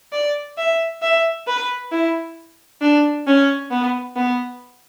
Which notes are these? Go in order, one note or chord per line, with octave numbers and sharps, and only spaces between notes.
D5
E5
E5
B4
E4
D4
C#4
B3
B3